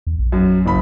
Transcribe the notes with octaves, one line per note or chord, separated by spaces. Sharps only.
E2
A#1
F#2
F#1 B5